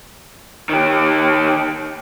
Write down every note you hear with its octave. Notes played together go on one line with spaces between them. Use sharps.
D#3 G4